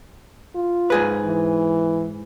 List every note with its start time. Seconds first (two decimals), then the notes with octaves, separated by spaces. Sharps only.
0.55 F4
0.90 G#2 G#4 B4
1.26 E3